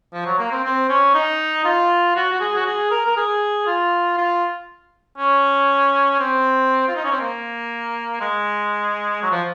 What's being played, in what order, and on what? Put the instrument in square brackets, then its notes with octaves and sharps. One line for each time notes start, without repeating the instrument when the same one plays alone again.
[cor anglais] F3
F#3
A#3
C4
C4
C#4
D#4
F4
F#4
F#4
G#4
F#4
G#4
A#4
A#4
G#4
F4
F4
C#4
C4
F4
D#4
C#4
C4
A#3
G#3
F#3
F3